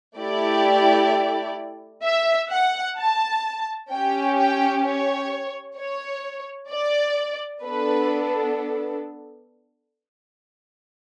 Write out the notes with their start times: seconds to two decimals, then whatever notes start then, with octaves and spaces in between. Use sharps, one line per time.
0.17 A3 E4 G4 D5
2.04 E5
2.51 F#5
2.98 A5
3.90 C#4 G4 G5
4.37 G5
4.85 C#5
5.77 C#5
6.71 D5
7.64 B3 D4 A4 B4